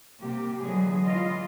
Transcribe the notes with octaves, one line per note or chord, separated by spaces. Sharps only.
C3 A#3 G4
D3 E3 F#3 G#3 G#4
E3 F4 D#5